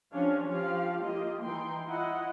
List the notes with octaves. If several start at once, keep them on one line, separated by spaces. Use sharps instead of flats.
F3 C#4 D4 G4 C#5 F5
F3 F4 G4 F5
A#3 F4 G4 D#5
E3 D#4 E4 G5 C6
E4 F4 D#5 F#5